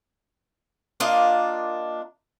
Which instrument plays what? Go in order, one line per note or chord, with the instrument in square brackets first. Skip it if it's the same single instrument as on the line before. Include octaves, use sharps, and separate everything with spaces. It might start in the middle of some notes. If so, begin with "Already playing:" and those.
[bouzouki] A#3 D4 F4 D#5